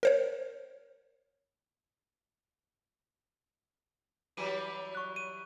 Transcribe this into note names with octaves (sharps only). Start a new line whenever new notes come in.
A#4 C5 C#5
E3 F#3 G3 D#7
C#6 F#6
D#7